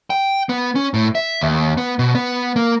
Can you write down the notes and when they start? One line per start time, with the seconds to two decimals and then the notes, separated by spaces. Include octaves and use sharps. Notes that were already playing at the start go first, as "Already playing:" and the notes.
0.10 G5
0.49 B3
0.76 C#4
0.94 A2
1.15 E5
1.41 D#2
1.78 B3
1.99 B2
2.15 B3
2.56 A#3